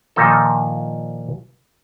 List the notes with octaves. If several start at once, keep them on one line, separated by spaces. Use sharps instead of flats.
A#2 D#3 F3 D#4 A4